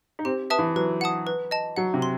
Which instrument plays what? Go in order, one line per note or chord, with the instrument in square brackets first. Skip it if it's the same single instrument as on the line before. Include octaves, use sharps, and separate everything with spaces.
[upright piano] D#4
[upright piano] C4 [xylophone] G4
[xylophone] B4 E5 A5 D#6
[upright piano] E3
[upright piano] F#3 [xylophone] B4
[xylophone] F#5 A5 D#6
B4
D#5 A5
[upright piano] F#3 [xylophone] F#5
[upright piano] C3
[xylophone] C6